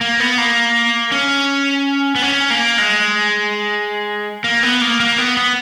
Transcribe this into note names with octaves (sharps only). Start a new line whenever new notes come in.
A#3
B3
A#3
C#4
B3
C#4
A#3
G#3
A#3
B3
A#3
A#3
B3
B3